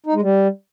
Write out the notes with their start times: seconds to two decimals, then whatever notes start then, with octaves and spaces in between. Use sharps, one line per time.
0.06 D#4
0.14 G#3
0.22 G3